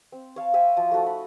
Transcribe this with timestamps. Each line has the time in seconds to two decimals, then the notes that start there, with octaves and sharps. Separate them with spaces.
0.12 C4
0.36 C#5 F5 A5
0.54 C5 E5 G5 G#5
0.77 F3 F4 F#4 D#6
0.91 A3 D#4 F#4 A4
1.06 B5